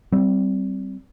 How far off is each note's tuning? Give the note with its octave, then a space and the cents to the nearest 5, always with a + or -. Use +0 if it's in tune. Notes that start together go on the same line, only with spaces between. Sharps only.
G3 -20 C4 +0